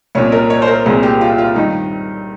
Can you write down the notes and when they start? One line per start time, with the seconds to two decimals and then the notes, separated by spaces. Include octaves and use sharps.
0.15 C2 A#2 C#4
0.32 A#4
0.50 C#5
0.62 C5
0.68 A#4
0.86 C2 A#2 G#4
1.03 G4
1.21 F4
1.38 F4
1.56 G2 D#3 D#4